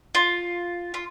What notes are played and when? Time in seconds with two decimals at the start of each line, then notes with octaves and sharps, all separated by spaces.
0.15 F4
0.94 F4